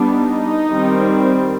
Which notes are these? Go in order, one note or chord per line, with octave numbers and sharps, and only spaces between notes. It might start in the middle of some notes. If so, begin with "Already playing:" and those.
Already playing: G3 B3 D4
D#4
D#3 G3 C4